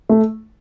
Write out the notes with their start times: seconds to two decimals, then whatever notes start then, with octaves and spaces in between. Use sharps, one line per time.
0.09 A3